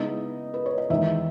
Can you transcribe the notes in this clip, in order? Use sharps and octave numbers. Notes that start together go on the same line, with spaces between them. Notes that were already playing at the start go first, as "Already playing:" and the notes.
Already playing: C#3 G#3 B3 D#4 E4 D#5
B4
C#5
D#5
E2 D#3 G#3 D#4 E4 E5